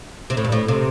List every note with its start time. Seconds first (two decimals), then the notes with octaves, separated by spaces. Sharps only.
0.30 C3
0.37 A2
0.45 G2
0.52 A2
0.68 C3